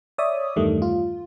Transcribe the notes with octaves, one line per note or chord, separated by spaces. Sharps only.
C#5 D5 E5 D#6
E2 G2 D#3 G3 A3
F4